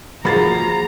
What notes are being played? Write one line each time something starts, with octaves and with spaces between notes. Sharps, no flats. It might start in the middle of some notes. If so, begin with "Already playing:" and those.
F3 A#3 F#4 G#4 A#5 B5 A6 C7